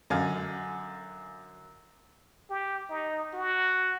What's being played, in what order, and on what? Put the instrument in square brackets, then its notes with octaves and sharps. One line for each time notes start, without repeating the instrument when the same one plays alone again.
[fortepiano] F#2 D3 F5 G#5
[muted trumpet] G4
D#4
F#4